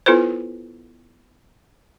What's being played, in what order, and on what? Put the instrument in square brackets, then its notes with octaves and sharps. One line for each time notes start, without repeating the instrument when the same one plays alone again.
[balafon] B3 E4 F4 A4 B4 C5